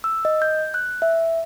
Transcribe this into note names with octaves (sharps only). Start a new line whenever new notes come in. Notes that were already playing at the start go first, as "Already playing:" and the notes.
E6
D#5
G6
F#6
E5